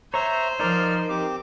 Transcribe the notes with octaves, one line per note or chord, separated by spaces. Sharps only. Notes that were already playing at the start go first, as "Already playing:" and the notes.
C5 C#5 E5 A#5
F3 D#4 A#4 D5 F6
C4 G4 D6